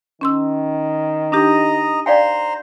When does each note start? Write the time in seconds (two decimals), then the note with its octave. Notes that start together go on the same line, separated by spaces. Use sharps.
0.21 D#3 C#4 C6 E6
1.32 D4 D#4 G4 D#5 A#5 D#6
2.06 C5 D5 F5 G5 A#5 C6